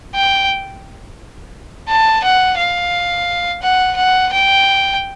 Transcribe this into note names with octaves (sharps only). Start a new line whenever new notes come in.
G5
A5
F#5
F5
F#5
F#5
G5